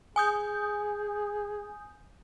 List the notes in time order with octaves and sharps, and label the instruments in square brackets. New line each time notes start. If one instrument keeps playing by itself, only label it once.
[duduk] G#4 [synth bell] G#5 D#6 G6